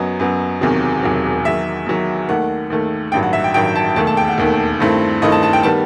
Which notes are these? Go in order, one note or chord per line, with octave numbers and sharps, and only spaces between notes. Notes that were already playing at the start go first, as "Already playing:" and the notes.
Already playing: F#2 F#3 B3 D#5
F#2 F#3 B3
E1 E2 C3 D#3 F#3
E1 E2 C3 D#3 F#3
E2 D#3 F#3 E5
E2 D#3 F#3
D#2 D#3 A3 F#5
D#2 D#3 A3
A1 G2 D#3 F#3 G5
F#5
E5
G5
A1 G2 D#3 F#3 G5
A5
E1 D#2 D#3 A3 A5
A5
G5
F#5
E1 D#2 D#3 A3
G2 D#3 A3 C4 E4
G2 D#3 A3 C4 E4 D#5
A5
A5
G5
D#3 G3 B3 A5